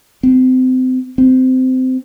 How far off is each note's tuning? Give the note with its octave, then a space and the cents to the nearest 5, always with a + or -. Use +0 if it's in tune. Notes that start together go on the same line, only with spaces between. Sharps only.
C4 -30
C4 -20